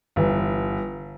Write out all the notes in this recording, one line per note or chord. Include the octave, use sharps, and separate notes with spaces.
G1 E3